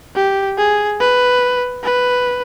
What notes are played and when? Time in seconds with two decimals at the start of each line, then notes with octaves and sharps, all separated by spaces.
0.16 G4
0.58 G#4
1.00 B4
1.83 B4